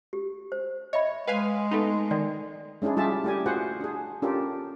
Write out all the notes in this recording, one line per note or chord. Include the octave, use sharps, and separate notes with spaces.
G4
C5
C#5 D#5 E5 B5
G#3 B4 F5 G5 G#5
A3 B3 D#4
D#3 D5
G#3 C#4 D4 E4 G#4
G3 F4 G4 G#4 E5 A5
A3 E4 G4 D5 G#5
F4 F#4 G#4 C5 F#5
D4 G#4
C#4 D4 F4 G4 A4 A#4